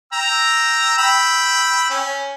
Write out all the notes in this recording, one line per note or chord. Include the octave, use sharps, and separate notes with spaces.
G5 A#5 E6
G5 B5 E6
C#4